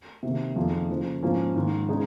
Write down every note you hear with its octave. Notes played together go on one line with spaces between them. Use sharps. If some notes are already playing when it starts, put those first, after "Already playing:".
C3 D#3 A#3
F2 D#3 A#3 F4 G#4
C#3 F3 A#3
G#2 F3 A#3 C#4 F4
G#2 D#3 A#3
C#3 G#3 D#4 G#4